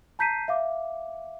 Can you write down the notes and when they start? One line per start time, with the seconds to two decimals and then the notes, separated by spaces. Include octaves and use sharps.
0.19 A5 A#5 G6 B6 C7 D#7
0.48 E5 F5 D6